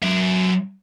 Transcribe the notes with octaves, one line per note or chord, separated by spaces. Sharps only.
F#3 E5